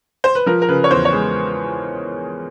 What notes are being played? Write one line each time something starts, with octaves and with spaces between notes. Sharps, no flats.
C5
B4
F3 A#4
A#4
C#3 B4
C#5
E2 C5
C#5
G#3